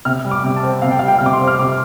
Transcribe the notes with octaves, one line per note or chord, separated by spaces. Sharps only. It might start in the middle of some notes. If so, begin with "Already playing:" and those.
C3 F6
G3
D6
C3
A5
C4
C3 F5
G5
G3 F5
G5
C3 F6
D6
C6
C4
F6
C3 D6